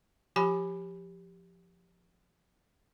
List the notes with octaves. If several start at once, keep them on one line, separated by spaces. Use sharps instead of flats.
F3 G4 G#5 B5